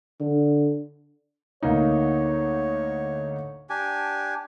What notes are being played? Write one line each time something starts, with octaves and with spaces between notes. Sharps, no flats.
D3
D2 A#3 D#4 C#5
D4 G4 G#5